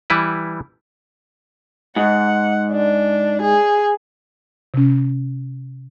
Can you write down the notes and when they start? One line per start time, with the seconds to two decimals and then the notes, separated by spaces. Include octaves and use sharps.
0.10 E3 G3 E4 B4
1.96 G#2 F#5
2.72 D4
3.42 G#4
4.74 C3 C#4